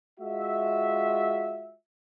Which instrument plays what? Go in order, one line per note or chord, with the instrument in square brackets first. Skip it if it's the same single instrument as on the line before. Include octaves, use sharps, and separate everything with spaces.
[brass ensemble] G#3 F4 F#4 E5